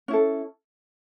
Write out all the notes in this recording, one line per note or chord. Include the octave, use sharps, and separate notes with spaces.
C#4 E4 A4